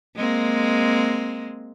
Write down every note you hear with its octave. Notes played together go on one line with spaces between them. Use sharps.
G#3 A#3 C4